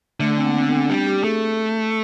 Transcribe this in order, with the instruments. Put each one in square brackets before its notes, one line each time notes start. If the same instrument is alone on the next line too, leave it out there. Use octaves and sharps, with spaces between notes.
[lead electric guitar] D3 [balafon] A3
[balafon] C4
A#3
C4
B3
C4
C#4
[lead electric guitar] G3 [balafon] D4
[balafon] G4
[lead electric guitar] A3 [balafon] G#4